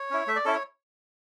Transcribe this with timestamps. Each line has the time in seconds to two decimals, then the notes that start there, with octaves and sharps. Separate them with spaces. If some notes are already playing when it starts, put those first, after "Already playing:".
Already playing: C#5
0.11 C#4 E4
0.27 A3 E5
0.36 D5
0.45 C#4 E4 A4
0.54 C#5